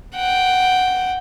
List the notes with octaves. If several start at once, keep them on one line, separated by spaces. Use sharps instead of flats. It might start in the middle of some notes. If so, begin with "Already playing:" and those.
F#5 G5